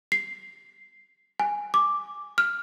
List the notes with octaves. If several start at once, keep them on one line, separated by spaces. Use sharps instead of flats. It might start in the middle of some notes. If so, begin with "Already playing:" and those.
C7
G#5
D6
F6